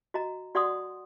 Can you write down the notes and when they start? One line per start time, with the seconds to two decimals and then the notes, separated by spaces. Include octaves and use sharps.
0.14 F#4 D#5 A#5
0.55 F#4 D5 F#5 C6 D#6